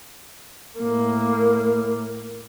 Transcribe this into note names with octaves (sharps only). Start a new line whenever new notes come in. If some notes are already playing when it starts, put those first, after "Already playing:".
A2 A#3